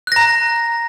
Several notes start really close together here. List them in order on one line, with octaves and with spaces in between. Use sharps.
F#6 A#6 A#5